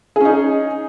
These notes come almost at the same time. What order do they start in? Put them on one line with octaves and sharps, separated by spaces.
G#4 C#4 D#4